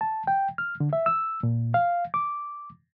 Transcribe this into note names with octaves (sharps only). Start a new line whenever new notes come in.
A5
G5
F6
D3
E5
E6
A#2
F5
D6